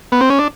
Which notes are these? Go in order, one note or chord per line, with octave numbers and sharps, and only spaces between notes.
B3
C4
C#4
D4